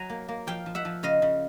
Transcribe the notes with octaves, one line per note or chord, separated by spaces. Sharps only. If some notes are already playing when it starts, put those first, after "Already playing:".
Already playing: F#3 G#5 A#5
A#3
A#3
F3 F5 G5
F3
E5 F#5
F3
C#3 D#5 F5
C#3